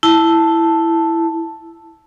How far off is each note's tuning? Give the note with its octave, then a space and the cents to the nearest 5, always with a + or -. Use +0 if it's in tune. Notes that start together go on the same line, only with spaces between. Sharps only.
E4 +5 A5 +0